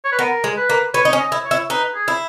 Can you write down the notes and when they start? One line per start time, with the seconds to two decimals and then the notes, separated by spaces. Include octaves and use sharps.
0.05 C#5
0.12 B4
0.19 B3 A#4
0.44 G#3
0.57 B4
0.70 A#3
0.94 B3 C#5
1.05 D#4
1.13 C#4
1.19 D#5
1.32 E4
1.45 C#5
1.51 E4
1.70 D#4 B4
1.95 G#4
2.08 E4